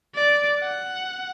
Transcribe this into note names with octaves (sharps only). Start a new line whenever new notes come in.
D5
F#5